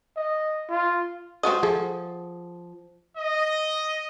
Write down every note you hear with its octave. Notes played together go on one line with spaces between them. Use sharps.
D#5
F4
F3 F#4 D#5 F#5 D#6
F3 G#4 A4
D#5